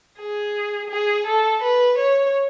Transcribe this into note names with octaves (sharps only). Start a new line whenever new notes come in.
G#4
G#4
A4
B4
C#5